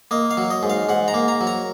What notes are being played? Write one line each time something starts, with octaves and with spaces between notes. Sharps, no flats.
A#3 D#5
F5
F#3
D#5
G#2
F5
G#2 F#5
A#5
A#3
A#5
F#3
A#5